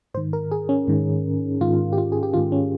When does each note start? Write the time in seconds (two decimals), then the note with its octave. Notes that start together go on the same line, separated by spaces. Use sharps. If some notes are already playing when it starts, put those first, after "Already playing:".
0.14 G#2 C5
0.17 D#3
0.33 A#4
0.52 G#4
0.69 C#4
0.88 G#2 D#3
1.61 G#2 D#3 F4
1.93 G4
1.98 F4
2.12 G#4
2.23 G4
2.34 G#2 D#3 F4
2.52 C#4